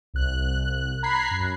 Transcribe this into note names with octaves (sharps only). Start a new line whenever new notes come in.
C2 F#6
A#5 B5 F#6 G#6 B6 C7
F#2